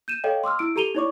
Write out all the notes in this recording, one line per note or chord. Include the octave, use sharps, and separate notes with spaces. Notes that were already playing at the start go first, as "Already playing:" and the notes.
G6 D#7 E7
A4 C#5 D#5 F5 G5
C6 D6 E6 F6
E4 E6 D7
G4 A4 A#5 D#7 F7 G7
D#4 E4 C#5 D5 C#6 D6